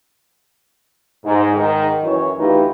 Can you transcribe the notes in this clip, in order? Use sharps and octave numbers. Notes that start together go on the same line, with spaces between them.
G#2
G#2 D#3
F#2 E3 C#5
D2 E3 D#4 F4 G4 B4